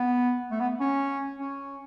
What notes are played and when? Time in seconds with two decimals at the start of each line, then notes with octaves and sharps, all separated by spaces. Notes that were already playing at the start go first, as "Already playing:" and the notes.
Already playing: B3
0.51 A3
0.60 B3
0.80 C#4
1.38 C#4